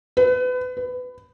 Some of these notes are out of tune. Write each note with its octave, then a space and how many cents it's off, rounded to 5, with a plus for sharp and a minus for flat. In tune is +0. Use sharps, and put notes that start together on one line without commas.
B4 +30
B4 +20